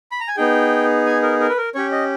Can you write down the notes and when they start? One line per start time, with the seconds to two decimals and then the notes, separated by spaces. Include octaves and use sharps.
0.12 B5
0.20 A#5
0.28 G#5
0.37 B3 D#4 G#4 G5
1.06 G#5
1.22 A#4
1.40 A#4
1.49 B4
1.57 A#4
1.75 C#4 G4 C#5
1.92 D#5